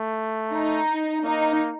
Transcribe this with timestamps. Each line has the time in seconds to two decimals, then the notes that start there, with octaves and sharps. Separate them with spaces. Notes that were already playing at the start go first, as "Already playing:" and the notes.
Already playing: A3
0.53 D#4
1.23 A#3 D#4